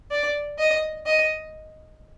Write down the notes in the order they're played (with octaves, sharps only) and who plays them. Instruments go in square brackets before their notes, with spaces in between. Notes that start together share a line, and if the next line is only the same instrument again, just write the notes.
[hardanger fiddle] D5
D#5
D#5